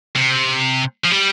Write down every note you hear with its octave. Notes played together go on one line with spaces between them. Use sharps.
C3
F3
G3